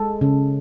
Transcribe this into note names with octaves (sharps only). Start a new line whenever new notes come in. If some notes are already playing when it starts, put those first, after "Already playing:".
Already playing: G#3 A4
C#3